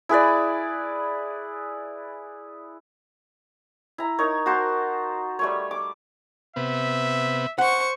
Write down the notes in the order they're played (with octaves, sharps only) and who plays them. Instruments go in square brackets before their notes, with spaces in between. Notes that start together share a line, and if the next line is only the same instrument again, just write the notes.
[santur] E4 G#4 B4 D5
E4 A#5
D#4 A#4 C#5
F#4 A#4 C5 A5
G3 A3 C#5
D6
[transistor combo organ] C3 B3 [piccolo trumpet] E5
[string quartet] C5 C#6 [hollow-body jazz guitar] F#5